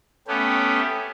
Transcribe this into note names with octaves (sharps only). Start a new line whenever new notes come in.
A3 B3 C#4 G4